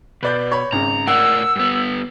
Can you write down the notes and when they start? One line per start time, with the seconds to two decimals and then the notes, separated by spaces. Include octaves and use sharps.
0.23 B2 B4 D5 G6
0.52 C#5 B5
0.72 G#1 C#3 A#5
1.07 A2 A#4 D5 F#5 E6
1.56 G2 B3